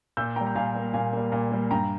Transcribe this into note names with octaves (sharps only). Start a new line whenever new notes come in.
A#2 E6 G6
G3 A#3 G5 A#5
A#5
A#2 F5 G#5
G3 A#3
A#2 F5 G#5
G3 A#3
A#2
G3 A#3
G2 G5 A#5